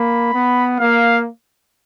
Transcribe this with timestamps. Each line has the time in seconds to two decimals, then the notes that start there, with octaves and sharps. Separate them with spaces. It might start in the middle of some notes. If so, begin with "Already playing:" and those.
Already playing: A#3 B5
0.34 B3
0.80 A#3 F5